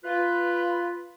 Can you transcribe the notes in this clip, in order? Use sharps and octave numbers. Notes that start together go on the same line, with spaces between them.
F4 B4